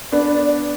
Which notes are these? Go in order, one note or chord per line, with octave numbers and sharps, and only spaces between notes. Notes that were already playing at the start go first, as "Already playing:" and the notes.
B3 D4 D5
D5